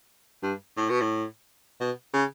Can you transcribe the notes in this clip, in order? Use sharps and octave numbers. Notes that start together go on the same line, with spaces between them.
G2
A2
B2
A2
B2
C#3